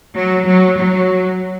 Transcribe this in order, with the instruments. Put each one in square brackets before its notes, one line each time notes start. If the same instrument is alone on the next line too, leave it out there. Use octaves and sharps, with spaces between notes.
[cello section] F#3
F#3
F#3